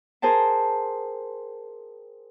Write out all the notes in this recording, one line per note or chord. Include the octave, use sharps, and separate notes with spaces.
G#4 A#4 C5 G5 A5